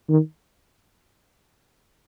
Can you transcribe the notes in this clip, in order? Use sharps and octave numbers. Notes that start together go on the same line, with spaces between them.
D#3